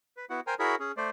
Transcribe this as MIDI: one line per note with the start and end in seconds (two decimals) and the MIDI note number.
0.17 0.25 71
0.30 0.40 59
0.30 0.40 64
0.30 0.40 66
0.30 0.40 78
0.47 0.54 70
0.47 0.54 72
0.47 0.54 79
0.47 0.54 80
0.47 0.54 82
0.59 0.76 64
0.59 0.76 66
0.59 0.76 68
0.59 0.76 70
0.59 0.76 73
0.59 0.76 83
0.80 0.92 61
0.80 0.92 68
0.97 1.10 57
0.97 1.10 72
0.97 1.10 74